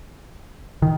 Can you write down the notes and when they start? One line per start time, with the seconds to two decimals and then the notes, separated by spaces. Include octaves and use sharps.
0.82 D#3